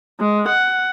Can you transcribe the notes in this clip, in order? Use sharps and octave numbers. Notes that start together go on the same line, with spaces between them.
G#3
F#5